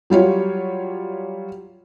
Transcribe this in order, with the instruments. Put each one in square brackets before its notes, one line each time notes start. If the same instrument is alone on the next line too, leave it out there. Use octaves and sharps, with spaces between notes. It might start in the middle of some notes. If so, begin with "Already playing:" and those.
[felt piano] F#3 G3 F4 C#5